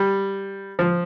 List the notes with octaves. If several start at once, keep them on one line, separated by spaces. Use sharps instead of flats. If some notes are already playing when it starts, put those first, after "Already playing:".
Already playing: G3
F3